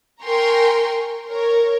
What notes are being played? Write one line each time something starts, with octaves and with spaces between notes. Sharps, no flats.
A#4 G5 G#5 A#5 C6 C#6
A#4 C#5